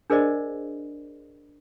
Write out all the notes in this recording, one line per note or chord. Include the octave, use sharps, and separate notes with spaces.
D4 G#4 A#4 C5 D5 D#5